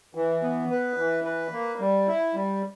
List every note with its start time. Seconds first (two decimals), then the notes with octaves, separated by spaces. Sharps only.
0.15 E3
0.43 B3
0.70 B4
0.98 E3
1.25 B4
1.53 A#3
1.80 G3
2.08 E4
2.34 G3